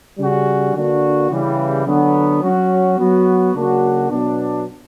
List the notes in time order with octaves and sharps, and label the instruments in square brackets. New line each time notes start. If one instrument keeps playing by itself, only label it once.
[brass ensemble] C#3 G3 C#4 F#4
D3 A#3 D4 F#4
C#3 E3 G3
D3 F#3 B3
F#3 C#4 F#4
F#3 B3 F#4
C#3 F#3 A#3 D4 F#4
B2 F#3 B3 D4